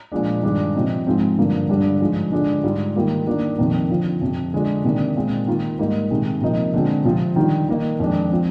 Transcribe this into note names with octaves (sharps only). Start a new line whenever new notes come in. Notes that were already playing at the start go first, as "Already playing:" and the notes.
A#2 F3 G#3 D4
G2 D#3 G#3 D4
C3 F3 C4 D#4
G#2 F3 G#3 C4
G2 D3 F3 A#3
G2 D3 G3 D4
G#2 F3 G#3
D3 G#3 D4 F4
G#2 G3 D4 F4
D#3 G3 A#3 F4
D#3 A#3 D4 F4
F2 C3 D#3 A#3
D3 F3 C4 F4
F2 C3 F3
D3 G#3 D4 F4
C3 D#3 A#3 D4
A#2 G#3 C4
D#3 A#3 F4
G#2 G3 A#3 D#4
C3 D#3 G#3
C3 F3 A#3 D#4
D3 G#3 C4 F4
C3 F3 C4 F4
D#3 G3 D4 F4
D#3 A#3 D#4
F2 D#3 G#3 D4
F3 C4